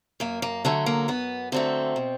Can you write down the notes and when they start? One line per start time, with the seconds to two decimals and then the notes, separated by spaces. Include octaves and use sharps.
0.20 F#2 A#3
0.42 A#3
0.65 D3 F#3 A3
0.86 A#3
1.08 F#2 B3
1.52 D3 F#3 A3 C4
1.96 B2